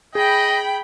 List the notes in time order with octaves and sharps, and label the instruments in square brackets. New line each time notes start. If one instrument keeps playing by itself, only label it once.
[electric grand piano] G#4 [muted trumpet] D#5 [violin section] G5 B5